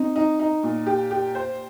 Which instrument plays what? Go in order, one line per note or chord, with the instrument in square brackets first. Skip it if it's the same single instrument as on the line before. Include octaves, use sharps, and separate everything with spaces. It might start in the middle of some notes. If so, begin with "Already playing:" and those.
Already playing: [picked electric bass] C4 [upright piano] D#4
[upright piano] D#4
D#4
A#2
G4
G4
C5